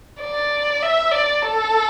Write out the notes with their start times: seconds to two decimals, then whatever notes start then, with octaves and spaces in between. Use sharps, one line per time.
0.21 D5
0.82 E5
1.11 D5
1.42 A4